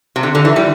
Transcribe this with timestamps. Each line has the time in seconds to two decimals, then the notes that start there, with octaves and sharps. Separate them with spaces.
0.16 C3
0.23 D3
0.35 D3
0.45 E3
0.56 G3